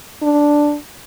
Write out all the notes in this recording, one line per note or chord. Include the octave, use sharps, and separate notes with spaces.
D4